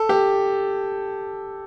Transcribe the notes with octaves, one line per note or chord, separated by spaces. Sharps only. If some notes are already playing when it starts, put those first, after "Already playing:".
Already playing: A4
G4